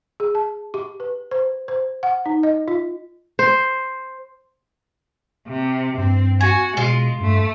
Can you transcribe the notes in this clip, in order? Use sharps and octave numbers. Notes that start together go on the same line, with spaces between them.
G#4
A5
G4
B4
C5
C5
F#5
D#4
D#5
F4
C5
C3
G2 C4
F#4 G#5
B2 G#3 F4
G2 A3